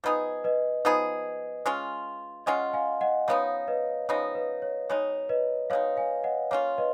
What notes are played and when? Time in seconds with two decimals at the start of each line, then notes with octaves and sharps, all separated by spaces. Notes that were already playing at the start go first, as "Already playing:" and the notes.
0.04 F3 B3 D#4 G#4 B4 D#5
0.44 B4 D#5
0.85 F3 B3 D#4 G#4
1.66 G#3 C#4 F4
2.46 G#3 C#4 F4 D#5 F#5
2.73 F5 G#5
3.01 D#5 F#5
3.28 C#3 F3 B3 D#4 C#5 F5
3.68 B4 D#5
4.09 C#3 F3 B3 D#4 C#5
4.35 B4
4.62 C#5
4.90 B2 G#3 D#4 C#5
5.29 B4 D#5
5.70 B2 G#3 D#4 C#5 F5
5.97 F5 G#5
6.24 D#5 F#5
6.51 A#3 C#4 F4 C#5 F5
6.78 B4 D#5